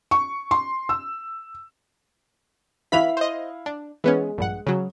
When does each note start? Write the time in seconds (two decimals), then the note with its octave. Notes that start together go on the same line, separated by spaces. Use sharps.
0.11 C#6
0.51 C6
0.89 E6
2.92 E3 E4 F5 B5 B6 F7
3.17 C5 D#5
3.66 D4
4.04 E3 G#3 B3 C#4
4.38 A#1 G2 F#5
4.67 C#3 F#3